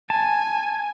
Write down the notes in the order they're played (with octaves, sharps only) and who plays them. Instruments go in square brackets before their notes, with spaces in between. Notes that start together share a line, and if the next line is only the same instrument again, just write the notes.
[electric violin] G#5 [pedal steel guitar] A5